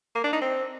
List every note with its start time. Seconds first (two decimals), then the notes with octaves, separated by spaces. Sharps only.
0.15 A#3
0.24 D4
0.33 D#4
0.41 C4